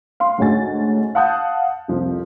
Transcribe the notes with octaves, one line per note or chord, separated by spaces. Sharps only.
F5 C6
D2 G#2 C#4 F#4 G#5 A6
F5 F#5 A5 D#6 F#6 G6
C2 F2 F3